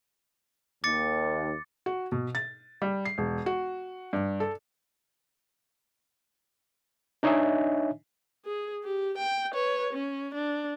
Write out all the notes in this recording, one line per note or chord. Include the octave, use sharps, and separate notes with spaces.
D#2 D6 A6 C#7
F#4
B2
A6
G3
C7
E1
F#4
G2
A4
D4 D#4 C#5 D#5 E5 G#5
G#4
G4
G5
B4 C#5
C#4
D4